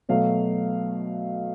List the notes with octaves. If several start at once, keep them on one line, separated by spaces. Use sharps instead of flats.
B2 F#3 A3 F5